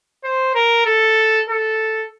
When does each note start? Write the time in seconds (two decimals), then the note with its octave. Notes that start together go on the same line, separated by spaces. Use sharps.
0.24 C5
0.55 A#4
0.86 A4
1.50 A4